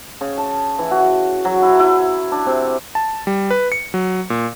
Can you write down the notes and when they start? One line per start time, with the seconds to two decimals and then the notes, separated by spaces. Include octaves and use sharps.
0.21 C#3
0.38 A5
0.79 E3
0.91 F#4
1.45 F#3
1.62 E4
1.79 E4
2.31 D4
2.46 C3
2.95 A5
3.27 G3
3.50 B4
3.72 C#7
3.94 F#3
4.30 A#2